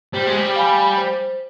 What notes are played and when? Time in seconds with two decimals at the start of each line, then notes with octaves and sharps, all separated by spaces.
0.13 G3 C5
0.27 G#3
0.38 G3
0.56 F5 G#5 B5
0.98 C5